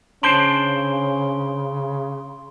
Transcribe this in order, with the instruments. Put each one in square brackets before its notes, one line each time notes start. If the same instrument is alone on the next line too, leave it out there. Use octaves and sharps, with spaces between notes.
[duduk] C#3 [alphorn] C#4 [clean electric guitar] D4 C5 A5 [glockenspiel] C6 D7 G7